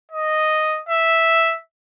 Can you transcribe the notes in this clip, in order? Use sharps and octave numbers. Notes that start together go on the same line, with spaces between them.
D#5
E5